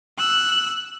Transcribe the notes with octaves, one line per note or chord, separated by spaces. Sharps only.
E6 F#6